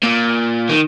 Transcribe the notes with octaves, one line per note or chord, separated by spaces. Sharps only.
A#2
D#3